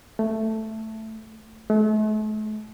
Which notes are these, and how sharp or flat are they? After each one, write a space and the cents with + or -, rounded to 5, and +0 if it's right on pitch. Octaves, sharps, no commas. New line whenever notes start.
A3 +5
A3 -40